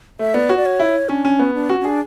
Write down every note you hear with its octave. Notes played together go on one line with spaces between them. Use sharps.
A3 E5
B3 D5
F#4 C#5
D5
C#5
E4
C#4 D4
C#4
B3 C#4
D4
C#4 F#4
C#4
D4 G#4